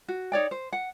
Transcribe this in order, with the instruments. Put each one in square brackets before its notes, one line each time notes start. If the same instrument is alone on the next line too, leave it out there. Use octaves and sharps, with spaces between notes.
[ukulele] F#4
D#4 C#5 D5 G5
C5
F#5